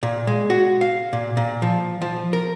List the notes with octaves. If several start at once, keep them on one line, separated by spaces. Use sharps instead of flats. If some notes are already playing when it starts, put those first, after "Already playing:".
A#2
G#3
F#4
F5
A#2
A#2
F3
F3
A#4